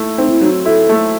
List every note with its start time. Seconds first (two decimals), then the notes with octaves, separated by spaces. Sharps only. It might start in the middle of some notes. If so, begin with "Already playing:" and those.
Already playing: A3 E4
0.18 C4 D#4
0.30 E4
0.41 F#3 D#4
0.65 E4 A4
0.89 A3